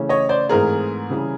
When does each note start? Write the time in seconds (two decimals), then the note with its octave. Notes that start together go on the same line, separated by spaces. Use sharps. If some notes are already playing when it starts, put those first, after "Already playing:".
Already playing: C#3 E3 A3 C#4
0.09 C#5 D#5
0.29 C5 D5
0.49 G#2 E3 A3 C4 G#4 A#4
1.10 C#3 E3 G3